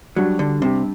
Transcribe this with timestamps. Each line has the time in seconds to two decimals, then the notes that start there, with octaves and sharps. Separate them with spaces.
0.16 F#3 G3 D4 F#4
0.39 D3
0.62 C3 G3 D4 G4